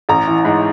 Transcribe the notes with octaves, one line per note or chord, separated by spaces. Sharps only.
A1 A#5
E3
G#2